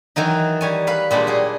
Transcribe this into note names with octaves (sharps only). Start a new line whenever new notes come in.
D#3 E3 F#3 D#4
G3 C#5 G#5
B4 F5 B5
A#2 G3 G#3 D4
F#3 G#4